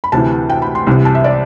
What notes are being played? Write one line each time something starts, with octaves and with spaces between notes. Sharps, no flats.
B5
D2 C3 E3 A5
G5
B5
C6
C2 C3 E3
A5
E5
D5